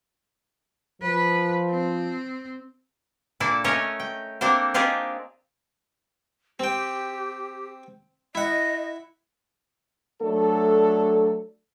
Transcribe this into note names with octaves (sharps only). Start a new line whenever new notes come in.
F3 B4
C4
A#2 A#3 D4 E4 A4 D5
A3 C#4 A#4 C#5 D#5
G5
A#3 C4 D4 A4 A#4 C5
D4 D#4 F4 G4 G#4 A#4
C4 G4 G5
E4 D#5 F#5
F#3 A3 D4 A4